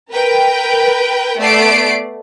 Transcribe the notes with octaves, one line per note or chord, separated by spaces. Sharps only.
A#4 B4 G5
A3 B3 D5 C7 D7